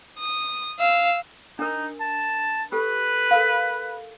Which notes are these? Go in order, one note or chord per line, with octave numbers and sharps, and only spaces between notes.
D#6
F5 E6
D4 D#4 A#4
A5
G4 A4 B4
A4 A#4 F5